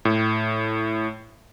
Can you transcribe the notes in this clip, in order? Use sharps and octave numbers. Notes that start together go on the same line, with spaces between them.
A2